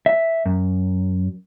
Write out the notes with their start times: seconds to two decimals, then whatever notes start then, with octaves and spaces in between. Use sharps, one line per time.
0.06 E5
0.45 F#2